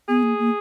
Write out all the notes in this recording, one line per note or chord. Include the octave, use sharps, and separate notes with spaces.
B3 G#4
A#3
A#3